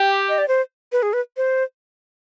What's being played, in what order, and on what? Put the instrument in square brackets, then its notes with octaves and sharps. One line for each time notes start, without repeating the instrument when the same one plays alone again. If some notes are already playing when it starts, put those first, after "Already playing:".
Already playing: [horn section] G4
[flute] D#5
D5
C5
B4
G#4
B4
C5